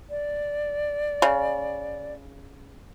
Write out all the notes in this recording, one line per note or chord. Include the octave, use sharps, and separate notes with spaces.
D5
C#3